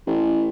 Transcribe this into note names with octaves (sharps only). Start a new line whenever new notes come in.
A1